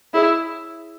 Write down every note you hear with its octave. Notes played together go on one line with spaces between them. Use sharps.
E4 G#4 C#5 E5